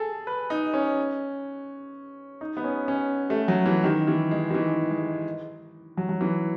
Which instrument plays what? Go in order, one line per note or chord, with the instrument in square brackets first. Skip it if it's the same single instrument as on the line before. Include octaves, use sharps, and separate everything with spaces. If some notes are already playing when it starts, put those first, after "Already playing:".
Already playing: [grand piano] G#4 A4
B4
D#4
C#4
D#4
B3
C#4
C#4
A3
F#3
E3
D#3
E3
G#3
D#3
E3
G#3
F#3
F#3
E3